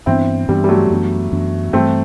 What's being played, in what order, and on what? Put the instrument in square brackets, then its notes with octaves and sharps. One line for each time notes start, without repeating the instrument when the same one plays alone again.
[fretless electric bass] G2 E3 B3 D4 [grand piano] C4 E4
[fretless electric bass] G2 E3 B3 D4 [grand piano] G3
[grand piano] G3
F#3 A3
[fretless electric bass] F#2 E3 B3 D4
F#2 E3 B3 D4
[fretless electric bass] G2 E3 G3 [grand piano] A3 C4